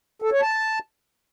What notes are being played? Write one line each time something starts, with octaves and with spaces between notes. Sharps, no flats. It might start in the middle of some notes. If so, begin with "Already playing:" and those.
A4
C#5
A5